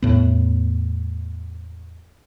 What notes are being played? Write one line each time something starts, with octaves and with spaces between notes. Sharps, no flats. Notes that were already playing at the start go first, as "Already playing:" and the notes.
E2 A2 B3